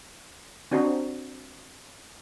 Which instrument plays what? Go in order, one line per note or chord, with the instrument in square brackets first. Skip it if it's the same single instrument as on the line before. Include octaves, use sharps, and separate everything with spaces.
[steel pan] C4 D4 F#4 C5 D#5 A#5